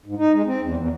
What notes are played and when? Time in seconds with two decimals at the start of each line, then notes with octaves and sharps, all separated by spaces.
0.06 G#2
0.18 D#4
0.33 G#3
0.46 C4
0.61 E2
0.77 E2